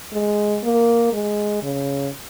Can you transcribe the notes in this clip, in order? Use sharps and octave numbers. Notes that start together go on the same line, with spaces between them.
G#3
A#3
G#3
C#3